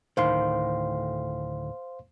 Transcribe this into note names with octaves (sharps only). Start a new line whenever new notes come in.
D2 A2 D#3 C5 F5 C6